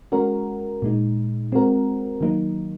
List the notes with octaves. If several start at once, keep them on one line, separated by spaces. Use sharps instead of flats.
G#3 C#4 F#4 A#4
A#2 G#3 D#4
G#3 C4 F#4 A#4
D#3 F#3 A#3 D#4